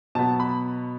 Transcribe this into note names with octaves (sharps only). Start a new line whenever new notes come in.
B2 F#3 B3 A5
B5